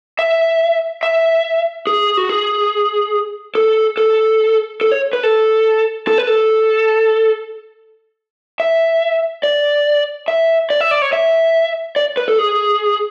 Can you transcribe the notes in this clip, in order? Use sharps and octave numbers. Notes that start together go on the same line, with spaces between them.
E5
E5
G#4
F#4
G#4
A4
A4
A4
C#5
B4
A4
A4
B4
A4
E5
D5
E5
D5
E5
D5
C#5
E5
D5
B4
A4
G#4